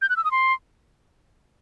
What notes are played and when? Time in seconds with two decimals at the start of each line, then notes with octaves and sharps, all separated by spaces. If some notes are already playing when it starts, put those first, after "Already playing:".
0.02 G6
0.09 F#6
0.17 E6
0.24 D#6
0.31 C6